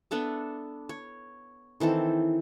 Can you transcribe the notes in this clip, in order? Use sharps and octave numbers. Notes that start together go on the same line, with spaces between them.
B3 D4 A4 E5
C#5
D#3 E3 C4 A4